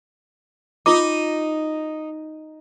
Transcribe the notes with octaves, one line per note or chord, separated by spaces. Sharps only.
D#4 F4 D6